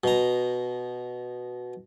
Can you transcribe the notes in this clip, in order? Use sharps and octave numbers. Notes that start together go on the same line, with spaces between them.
B2 A#5